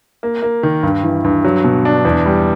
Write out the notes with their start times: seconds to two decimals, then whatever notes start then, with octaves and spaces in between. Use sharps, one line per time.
0.23 A#3
0.42 A#3
0.63 D#3
0.83 G2
1.03 E3
1.24 G2
1.44 F#3
1.64 B2
1.85 D4
2.05 E2
2.26 G3